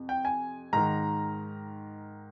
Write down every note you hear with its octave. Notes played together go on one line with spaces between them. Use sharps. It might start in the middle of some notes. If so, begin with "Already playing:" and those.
Already playing: F2 C3
G5
G#5
G#2 D#3 A#5